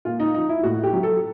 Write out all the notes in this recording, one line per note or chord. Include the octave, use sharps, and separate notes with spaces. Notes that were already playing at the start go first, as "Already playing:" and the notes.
A#2 F4
D#4
F3 D#4
E4
A2 F#4
G4
F#3
A4